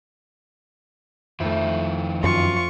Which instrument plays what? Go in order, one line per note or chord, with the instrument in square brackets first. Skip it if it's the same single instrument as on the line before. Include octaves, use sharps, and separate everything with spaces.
[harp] F2 A3 [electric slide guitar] D#3 E4
[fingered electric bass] F#2 [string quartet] F4 C#6